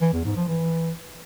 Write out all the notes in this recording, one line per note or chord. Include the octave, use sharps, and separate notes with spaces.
E3
E2
G#2
F3
E3